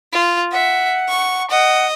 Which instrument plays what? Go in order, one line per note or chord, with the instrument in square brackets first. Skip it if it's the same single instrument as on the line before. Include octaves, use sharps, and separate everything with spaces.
[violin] F4
[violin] E5 [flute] F#5
[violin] C#6
[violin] D#5 [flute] F#5